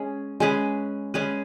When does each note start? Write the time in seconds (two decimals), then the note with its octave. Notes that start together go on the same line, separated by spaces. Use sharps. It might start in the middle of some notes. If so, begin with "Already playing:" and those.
Already playing: G#3 C#4 G#4
0.40 G#3 C#4 G#4 B4
1.14 G#3 C#4 G#4 B4